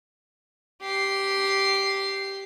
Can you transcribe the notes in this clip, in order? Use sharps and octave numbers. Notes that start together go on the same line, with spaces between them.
G4 C7